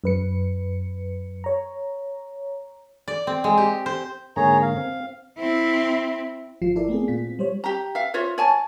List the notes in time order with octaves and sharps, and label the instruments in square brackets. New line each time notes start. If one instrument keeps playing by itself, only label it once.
[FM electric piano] F#2 B4 C#7
C#5 A#5
[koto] D5
C4
G#3
G4
C5
[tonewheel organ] G#2 D3 A#3 [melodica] G#4 C#5 A#5
[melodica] F5
[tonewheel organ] C4
[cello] C4 E4
[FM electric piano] G#1 F3 F4 C7
E4 A4 A#4 D5
A3 B3 C4 G#4
A#2 F4 B6
C4
G3 C5 C#5
[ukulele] G4 A#5
E5 F5
F4 C5 C#5 E5
C#5 G#5 A5